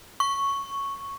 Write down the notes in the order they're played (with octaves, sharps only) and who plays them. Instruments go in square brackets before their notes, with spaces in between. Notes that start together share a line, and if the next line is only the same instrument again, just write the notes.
[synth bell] C#6